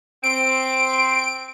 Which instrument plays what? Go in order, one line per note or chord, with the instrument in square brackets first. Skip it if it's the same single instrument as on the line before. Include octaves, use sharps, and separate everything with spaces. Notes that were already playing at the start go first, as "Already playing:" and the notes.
[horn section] C4 [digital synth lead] D7